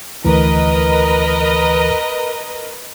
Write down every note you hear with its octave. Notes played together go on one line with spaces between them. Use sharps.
D2 E3 A#4 B4 D#5